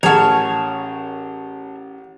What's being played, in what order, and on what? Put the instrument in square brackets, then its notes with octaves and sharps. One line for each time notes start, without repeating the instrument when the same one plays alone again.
[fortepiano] A1 G#4 [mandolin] C#4 C#5 [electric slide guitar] A#4 A5 [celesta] F#5 F7